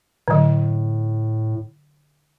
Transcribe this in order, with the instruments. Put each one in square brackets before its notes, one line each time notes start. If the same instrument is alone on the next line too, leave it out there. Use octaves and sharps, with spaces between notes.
[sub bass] A2 [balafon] D3 F#3